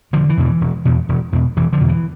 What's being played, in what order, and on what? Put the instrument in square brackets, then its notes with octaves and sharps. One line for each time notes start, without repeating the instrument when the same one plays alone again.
[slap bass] E1 D3 F3
E3
E2 B2
E3
E1
E2 B2
E1
E2 B2
E1 E3
D3 F3
E2 B2
E3